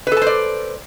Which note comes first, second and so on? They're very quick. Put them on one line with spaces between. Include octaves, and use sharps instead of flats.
B4 A4 A5 C5 D5